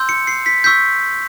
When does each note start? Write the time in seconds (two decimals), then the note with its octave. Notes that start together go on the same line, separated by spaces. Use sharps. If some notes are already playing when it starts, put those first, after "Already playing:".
Already playing: C6 E6 G6
0.09 C#7
0.27 C7
0.46 B6
0.64 C#6 E6 G6 B6